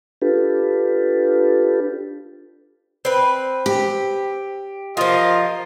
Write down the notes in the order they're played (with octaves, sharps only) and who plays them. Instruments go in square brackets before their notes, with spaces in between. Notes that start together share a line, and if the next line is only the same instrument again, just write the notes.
[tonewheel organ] D4 F4 G4 A4 B4
[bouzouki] C4 B4
[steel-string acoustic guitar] G4
[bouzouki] F3 A#3 [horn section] F4 D#5